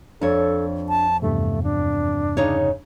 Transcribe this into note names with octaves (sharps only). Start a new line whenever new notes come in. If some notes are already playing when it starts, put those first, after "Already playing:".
F2 D4 A4 C#5
A5
E2 G2 C3 A3
D4
C#3 D#4 C#5